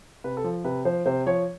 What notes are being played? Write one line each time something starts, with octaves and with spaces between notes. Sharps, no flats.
C3 B4
A4
F3
C3 B4
F3 C5
C3 C5
F3 C#5